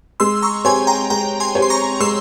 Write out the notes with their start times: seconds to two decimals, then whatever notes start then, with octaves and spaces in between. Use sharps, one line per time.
0.20 G#3 C6 E6
0.42 A#5 C#6
0.65 C4 G4 C#5 G#5 C6
0.87 G5 A#5
1.10 G#3 G5 A#5
1.40 G#5 C6
1.55 C4 G4 C#5
1.62 C6
1.70 A#5 C#6
2.00 G#3 C6 E6